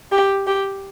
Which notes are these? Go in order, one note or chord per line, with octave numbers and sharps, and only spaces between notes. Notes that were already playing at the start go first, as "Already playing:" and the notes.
G4
G4